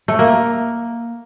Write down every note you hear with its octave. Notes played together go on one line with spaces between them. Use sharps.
A3
A#3